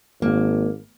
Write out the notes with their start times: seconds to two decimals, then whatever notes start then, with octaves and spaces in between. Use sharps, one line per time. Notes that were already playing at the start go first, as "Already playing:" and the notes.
0.22 G#1 A#3